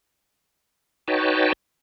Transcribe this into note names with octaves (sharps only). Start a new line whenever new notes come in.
D#4 F#4 B4 C#5 G5 A5